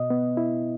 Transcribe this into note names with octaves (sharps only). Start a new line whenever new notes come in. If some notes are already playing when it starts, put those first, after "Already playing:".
Already playing: B2 D#5
B3
E4